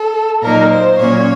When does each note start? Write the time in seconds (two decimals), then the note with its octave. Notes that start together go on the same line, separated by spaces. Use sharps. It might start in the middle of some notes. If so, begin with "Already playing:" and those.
Already playing: A4
0.42 A#2 F#3 A#3 D#4 A#4
0.71 C5
0.99 A#2 F#3 A#3 C#4 C#5